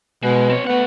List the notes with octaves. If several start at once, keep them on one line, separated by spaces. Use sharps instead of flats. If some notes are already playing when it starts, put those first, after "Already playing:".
B2 G#3
C4 C#5
A3 B3 F#5